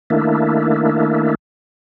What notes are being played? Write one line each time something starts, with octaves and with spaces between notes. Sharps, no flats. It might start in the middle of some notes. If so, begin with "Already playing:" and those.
D#3 A3 A#3 D4 E4